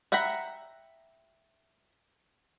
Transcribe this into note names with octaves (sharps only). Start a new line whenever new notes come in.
E5 F#5 G5 A#5 B5